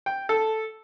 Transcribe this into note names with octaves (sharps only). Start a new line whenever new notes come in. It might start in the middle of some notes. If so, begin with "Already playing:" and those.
G5
A4